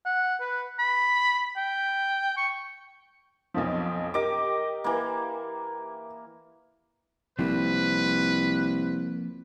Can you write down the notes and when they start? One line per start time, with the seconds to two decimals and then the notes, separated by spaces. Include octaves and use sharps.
0.05 F#5
0.41 B4
0.79 B5
1.57 G5
2.37 C#6
3.54 B1 F2 F3
4.14 G4 A#4 D#5 D6
4.84 E3 A#3
7.39 C2 F3 A#3 C4 B4